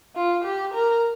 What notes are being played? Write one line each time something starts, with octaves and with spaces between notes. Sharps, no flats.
F4
G4
A#4